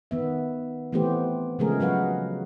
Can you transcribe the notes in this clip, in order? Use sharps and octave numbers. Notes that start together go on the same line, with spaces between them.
D#3 B3 E5
E3 A3 B3 C4 G4 C5
C#3 F3 G#3 A3 G#4 A#4
F#3 F#4 B4 F5 F#5